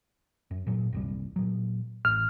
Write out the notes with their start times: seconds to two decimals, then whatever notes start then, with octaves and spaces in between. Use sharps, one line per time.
0.51 F#2
0.67 A#2 F#3
0.93 F#1 C2 G3
1.36 A#2 F#3
2.05 A1 F6